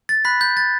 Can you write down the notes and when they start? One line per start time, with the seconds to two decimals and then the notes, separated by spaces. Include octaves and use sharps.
0.09 A6
0.25 B5 F#6 B6
0.41 G6
0.57 A6